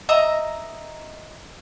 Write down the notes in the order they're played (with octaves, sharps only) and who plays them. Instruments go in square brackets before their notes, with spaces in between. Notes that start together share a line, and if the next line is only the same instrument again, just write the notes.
[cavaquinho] D#5 E5 A#5 D#6